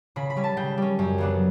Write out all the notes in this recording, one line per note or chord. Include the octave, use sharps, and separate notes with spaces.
C#3 B5
B5
G3 C#4
A5
C#3 G5
G3 C#4
F#2
C#3 F#3 B3 D4